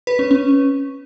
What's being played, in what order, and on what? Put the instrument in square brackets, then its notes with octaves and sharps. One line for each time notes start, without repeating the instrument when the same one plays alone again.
[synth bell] B4
C#4
C#4